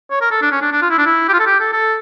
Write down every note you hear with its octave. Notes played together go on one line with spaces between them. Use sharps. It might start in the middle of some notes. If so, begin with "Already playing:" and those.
C#5
A#4
A4
D4
C#4
D4
D4
F4
E4
D4
E4
G4
F4
A4
G4
A4
A4